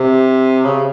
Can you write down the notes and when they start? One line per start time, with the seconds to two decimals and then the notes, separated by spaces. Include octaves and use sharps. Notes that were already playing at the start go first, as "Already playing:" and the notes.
Already playing: C3
0.65 C#3